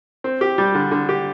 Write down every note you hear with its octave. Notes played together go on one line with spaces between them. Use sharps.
C4
G4
G3
D3
D3
G4